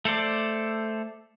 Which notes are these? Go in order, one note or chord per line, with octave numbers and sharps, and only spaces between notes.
A3 A4 C5 D5